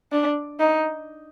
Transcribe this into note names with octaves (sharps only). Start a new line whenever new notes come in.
D4
D#4